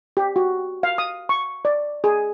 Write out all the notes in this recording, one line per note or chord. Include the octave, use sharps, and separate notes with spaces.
G4
F#4
F5
D#6
C#6
D5
G#4